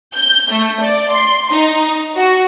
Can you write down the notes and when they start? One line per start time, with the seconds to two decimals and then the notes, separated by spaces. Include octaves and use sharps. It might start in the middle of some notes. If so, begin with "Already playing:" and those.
0.14 G6
0.51 A3
0.81 D5
1.11 C6
1.51 D#4
2.16 F#4